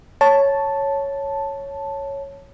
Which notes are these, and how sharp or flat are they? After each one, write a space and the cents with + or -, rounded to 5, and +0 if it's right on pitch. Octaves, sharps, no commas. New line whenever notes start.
C#5 +0 A5 +0